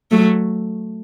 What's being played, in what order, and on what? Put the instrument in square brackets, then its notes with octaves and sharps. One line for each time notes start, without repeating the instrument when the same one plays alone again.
[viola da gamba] F#3 A3